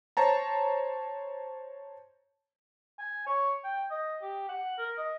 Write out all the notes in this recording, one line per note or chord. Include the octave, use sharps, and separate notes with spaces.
C5 C#5 A5 A#5
G#5
C#5
G5
D#5
G4
F#5
A#4
D#5